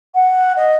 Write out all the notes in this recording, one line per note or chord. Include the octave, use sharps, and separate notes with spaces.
F#5
D#5